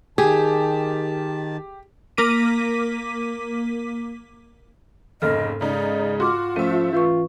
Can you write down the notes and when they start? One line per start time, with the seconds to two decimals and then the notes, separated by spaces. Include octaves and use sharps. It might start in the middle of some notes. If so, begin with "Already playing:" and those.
0.18 D#3 G4 G#4 A5
2.17 A#3 A#4 D6 B6 D#7
5.22 F1 G#2 C#3 A#3 A4 D#5 F6
5.61 C#3 G#3 D#4 D5
6.20 F4 F#4 C6 D6 F6
6.56 F3 A3 C#4 E5
6.93 E3 F4 B4 C#6